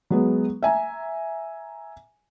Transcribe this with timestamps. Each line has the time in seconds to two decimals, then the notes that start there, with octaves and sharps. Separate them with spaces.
0.10 F#3 G#3 B3
0.63 E5 G#5 A#5